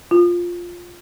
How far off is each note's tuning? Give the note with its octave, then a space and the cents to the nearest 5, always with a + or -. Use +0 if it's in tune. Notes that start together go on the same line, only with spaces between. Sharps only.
F4 +5